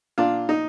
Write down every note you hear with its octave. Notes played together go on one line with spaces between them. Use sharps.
A#2 D4 F4
D#4